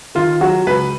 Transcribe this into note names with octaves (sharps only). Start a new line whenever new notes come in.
D#3 F4
F#3 F#4
C#2 B4